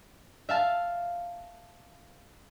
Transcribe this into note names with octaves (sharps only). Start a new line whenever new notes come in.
E5 F5 A5